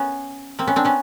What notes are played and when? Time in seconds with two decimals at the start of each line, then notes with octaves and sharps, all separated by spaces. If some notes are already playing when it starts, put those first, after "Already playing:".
Already playing: B3 C#4
0.59 A#3 C4
0.67 B3 C#4
0.76 C4 D4
0.85 B3 C#4